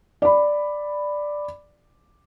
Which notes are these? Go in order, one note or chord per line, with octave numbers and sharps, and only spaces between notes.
D5 B5